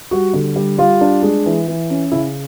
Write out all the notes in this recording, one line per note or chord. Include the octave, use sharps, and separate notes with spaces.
G3 F#4
D3
G3
G3 F4
D4
G#3
E3
E3
C#4
C#3 E4